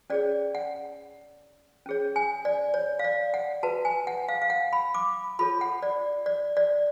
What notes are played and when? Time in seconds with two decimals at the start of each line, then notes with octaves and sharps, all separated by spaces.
0.10 C#4 G#4 C#5 D5
0.55 F#5
1.86 C#4 G#4 C#5
2.16 G#5
2.45 D5
2.74 C#5
2.99 F5
3.04 D5
3.34 F#5
3.63 F#4 B4 A5
3.85 G#5
4.07 F#5
4.29 F5
4.42 F5
4.50 F#5
4.73 B5
4.95 D6
5.39 F4 A4 C#5 B5
5.61 F#5
5.83 D5
6.26 D5
6.57 D5